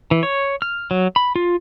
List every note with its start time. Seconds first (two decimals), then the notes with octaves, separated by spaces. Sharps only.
0.11 E3
0.23 C#5
0.62 F6
0.91 F#3
1.16 B5
1.36 F4